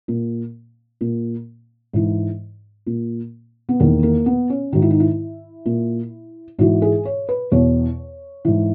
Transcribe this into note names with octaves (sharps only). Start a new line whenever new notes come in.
A#2
A#2
G#2 E3
A#2
B3
E2 D#3 A#3
A#3
B3
C#4
G#2 D#3 F#4
E4
D#4
E4
A#2
G#2 E3 F#4
G#4
C#5
B4
E2 B2 C#5
G#2 E3